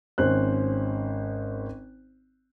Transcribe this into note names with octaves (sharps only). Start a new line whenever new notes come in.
G#1 C#4 C5 F#6